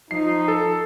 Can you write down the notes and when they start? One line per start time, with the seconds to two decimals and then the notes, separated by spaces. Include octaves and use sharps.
0.11 F3 D#4 C7
0.48 A4